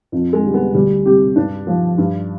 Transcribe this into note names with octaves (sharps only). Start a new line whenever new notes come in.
F2
G#3
D3 G3
B3
D2 G3
C3 G3 G4
G2 D4
F3
G2